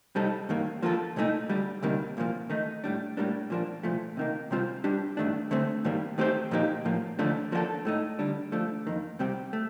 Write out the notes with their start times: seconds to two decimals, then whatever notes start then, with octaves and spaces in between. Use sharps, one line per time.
0.15 C3 G3 C4 D#4 A4
0.49 G2 D#3 A#3
0.82 F3 A#3 F4 A4
1.16 C2 A#2 A3 D#4
1.49 D2 D3 G3 D4
1.82 D2 C3 D#3 G3 A#3
2.17 C2 A#2 F3 A#3
2.50 D#3 A3 D#4
2.84 A2 G3 D4
3.17 A2 G3 A#3 D4
3.50 A#2 F3 A#3 D4
3.83 C2 A#2 F3 A3
4.17 C3 D#3 A#3
4.51 C3 G3 C4 F4 C5
4.84 G3 D4 G4
5.17 G2 D#3 A3 D4
5.51 D3 A3 C4
5.84 G2 D#3 G3 A#3
6.18 D#3 A3 C4 G4 C5
6.51 A#2 F3 A#3 D#4 G4
6.85 A2 F3 A#3
7.19 D#2 D3 F3 A3 D4
7.52 F3 A#3 D4 F4 A4
7.85 A2 A3 D#4
8.19 D3 G3 D4
8.52 F3 A3 D4
8.87 F2 D#3 A#3
9.19 C2 C3 G3 C4 G4
9.53 A3